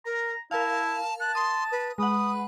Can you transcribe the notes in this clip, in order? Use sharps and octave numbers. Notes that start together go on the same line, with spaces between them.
A#4 A#5
E4 A#4 F5 A5
A5 F#6
C6 D#6
B4
G#3 B4 F#5 D#6